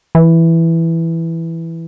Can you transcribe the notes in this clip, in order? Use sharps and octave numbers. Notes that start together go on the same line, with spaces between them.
E3